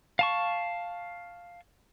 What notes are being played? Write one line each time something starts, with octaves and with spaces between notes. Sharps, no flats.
F5 A5 C#6